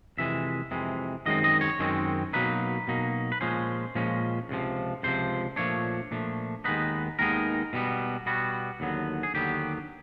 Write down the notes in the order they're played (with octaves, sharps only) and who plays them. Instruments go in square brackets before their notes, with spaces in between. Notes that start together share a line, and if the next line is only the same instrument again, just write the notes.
[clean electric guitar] F2 C3 E3 G#3 E5
F2 C3 E3 G#3
F#2 D#3 G#3 C4 D#5
D#5
C#5
F#2 D#3 G#3 C4
B2 F#3 A#3 D#4 B4
B2 F#3 A#3 D#4
B4
A#2 F3 G#3 C#4 C5
A#2 F3 G#3 C#4
C#2 C3 F3
C#2 C3 F3 C5
A#2 F3 A3 D4 C#5
A#2 F3 A3 D4
D#2 D#3 G#3 B3 D#4 B4
D#2 D#3 G#3 B3 D#4 A#4
B2 G3 B3
B2 G3 B3 F#4
D#2 D3 F#3 B3
G#4
D#2 D3 F#3 B3 G4